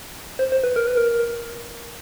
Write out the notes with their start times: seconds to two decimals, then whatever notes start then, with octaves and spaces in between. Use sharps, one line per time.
0.39 C5
0.52 C5
0.64 B4
0.76 A#4
0.87 B4
0.97 A#4